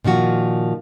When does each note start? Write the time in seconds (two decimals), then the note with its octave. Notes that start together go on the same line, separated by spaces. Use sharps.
0.04 A#2 D#3 F3 F#4